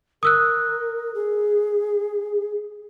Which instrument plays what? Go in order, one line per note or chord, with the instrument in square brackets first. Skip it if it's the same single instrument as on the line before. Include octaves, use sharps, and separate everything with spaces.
[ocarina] A#4 [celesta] D#6 E6 F#6
[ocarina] G#4